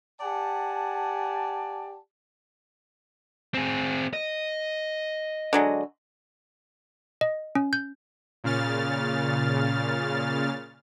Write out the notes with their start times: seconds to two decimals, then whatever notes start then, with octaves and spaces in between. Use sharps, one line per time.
0.21 G4 D5 F#5 G#5 A5
3.54 C4 G#4
4.13 D#5
5.53 D3 F#3 G#3
7.21 D#5
7.55 C#4
7.73 G6
8.44 A#2 C#3 F6 A6